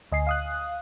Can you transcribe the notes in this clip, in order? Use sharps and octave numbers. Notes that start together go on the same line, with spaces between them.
D2 D#5 G#5 C7
F5 D#6 F#6